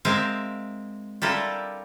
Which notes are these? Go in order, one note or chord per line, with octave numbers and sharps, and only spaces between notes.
G#3 C4 A#4 E5 F5
G3 D4 E4 F4 A4 A#4